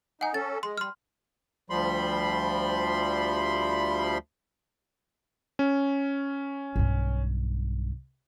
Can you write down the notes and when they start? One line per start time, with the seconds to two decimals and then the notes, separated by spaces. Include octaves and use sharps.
0.21 D#4 F#5 G#5
0.34 C#4 A4 A6
0.63 G#3 C6
0.78 G3 C6 F6
1.70 D2 F3 G3 B5 C6
5.59 C#4
6.76 B1 G2